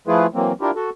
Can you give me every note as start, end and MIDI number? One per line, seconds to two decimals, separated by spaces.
0.07 0.26 53
0.07 0.26 57
0.07 0.26 64
0.07 0.26 65
0.07 0.26 68
0.07 0.26 71
0.34 0.52 52
0.34 0.52 54
0.34 0.52 58
0.34 0.52 60
0.61 0.71 62
0.61 0.71 64
0.61 0.71 65
0.61 0.71 67
0.61 0.71 70
0.76 0.90 66
0.76 0.90 69